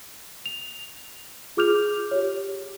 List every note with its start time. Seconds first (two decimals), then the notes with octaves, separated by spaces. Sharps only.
0.46 F7
1.57 F4 G#4 D6 F6 G6 F7
2.11 G4 C#5